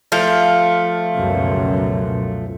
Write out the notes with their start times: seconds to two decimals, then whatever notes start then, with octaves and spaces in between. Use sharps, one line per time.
0.12 F3 A3 F5
1.16 C#2 F#2 B2